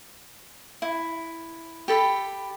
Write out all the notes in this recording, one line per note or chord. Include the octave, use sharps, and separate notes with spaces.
E4
G4 A4 B5